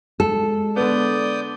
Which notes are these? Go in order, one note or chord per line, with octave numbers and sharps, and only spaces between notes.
G#3 A4
D3 B3 D5 D#6 G6